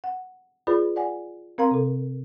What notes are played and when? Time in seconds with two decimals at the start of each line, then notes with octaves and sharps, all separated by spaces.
0.04 F#5
0.67 F4 G#4 B4 D5 B5
0.96 D5 F#5 G#5
1.58 C4 A#4 F5 A#5 C6
1.71 C3 A4